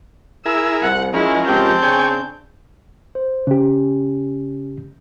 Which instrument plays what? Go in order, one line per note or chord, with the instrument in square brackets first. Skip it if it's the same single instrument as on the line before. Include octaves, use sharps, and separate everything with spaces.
[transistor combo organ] E4 G#4 A#4 [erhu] E6
[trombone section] C2 [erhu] F#5
[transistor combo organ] F3 C#4 A#4 [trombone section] G#3 [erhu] E4
[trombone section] C#2 G#3 G4 [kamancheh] C4 A5 [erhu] G6
[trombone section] C#3 D4 G#4 [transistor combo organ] C#5 G5 G#5
[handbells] C5
[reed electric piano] C#3 G4 [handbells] C#4